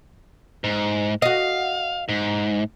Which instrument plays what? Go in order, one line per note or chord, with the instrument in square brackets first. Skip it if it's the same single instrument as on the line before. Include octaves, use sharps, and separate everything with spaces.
[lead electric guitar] G#2
[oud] F#4 D#5 [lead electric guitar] F5
[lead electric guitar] G#2